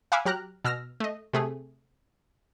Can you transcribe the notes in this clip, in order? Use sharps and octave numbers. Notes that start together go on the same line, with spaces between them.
F5 F#5 G#5 B5 D6 E6
F#3 G4 A#5 F6 F#6
B2 E6 F6 A#6
A3 D#5
C3 A3 G#4